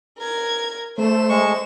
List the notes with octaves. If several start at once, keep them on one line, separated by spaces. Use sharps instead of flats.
A#4 G#6
A3 C5 E7
G#3 C#6